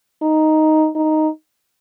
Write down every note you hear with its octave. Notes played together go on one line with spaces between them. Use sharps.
D#4
D#4